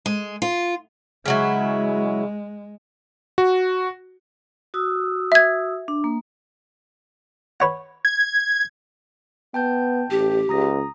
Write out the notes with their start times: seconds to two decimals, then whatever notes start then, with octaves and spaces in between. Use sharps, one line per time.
0.06 G#3
0.42 F4
1.26 C#3 F#3 G#3 E4
3.38 F#4
4.74 F#4 D#6 E6
5.32 E5 G#6
5.88 D4
6.04 A#3
7.60 B4 C#5 F#5
8.05 G#6
9.54 B3 G5 A5 G6
10.11 A1 G4
10.49 C#2 A#5 D#6 A#6